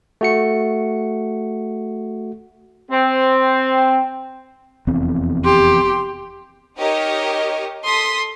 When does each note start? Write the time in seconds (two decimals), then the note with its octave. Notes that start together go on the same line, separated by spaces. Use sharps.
0.21 A3 F#4 C#7
2.91 C4
4.87 F1 E2 C4
5.45 G4 C6
6.79 D#4 G4 A#4 C#5 D#5
7.84 A4 C6 D#6 B6